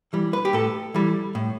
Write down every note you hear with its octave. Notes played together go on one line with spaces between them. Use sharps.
E3 G3
B4
G4
A2 A4
E3 G3
A2